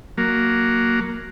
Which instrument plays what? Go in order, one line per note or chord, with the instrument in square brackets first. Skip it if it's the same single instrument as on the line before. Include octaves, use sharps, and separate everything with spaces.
[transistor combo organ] F#3 A#3